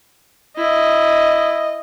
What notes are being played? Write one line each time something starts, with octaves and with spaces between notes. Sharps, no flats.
E4 D#5